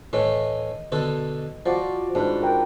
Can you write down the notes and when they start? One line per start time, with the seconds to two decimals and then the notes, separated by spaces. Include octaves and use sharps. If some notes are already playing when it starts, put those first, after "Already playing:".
0.13 A2 E3 A3 D#5
0.92 B2 D3 A4
1.66 F3 F4 F#4 D5
2.15 G#2 D4 B4
2.42 A#4 B4 G5